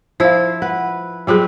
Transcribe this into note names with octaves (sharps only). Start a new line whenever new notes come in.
F3 E4 C5 F5
B4 F#5
F#3 G3 C4 F4 G#4 B4